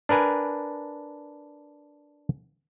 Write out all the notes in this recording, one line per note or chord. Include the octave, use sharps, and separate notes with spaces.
D4 A#4 B4 G#5